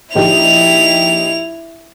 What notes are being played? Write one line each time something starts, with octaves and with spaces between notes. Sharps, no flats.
A#1 D#4 E4 G4 F7